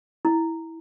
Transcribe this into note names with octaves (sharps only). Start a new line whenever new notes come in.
E4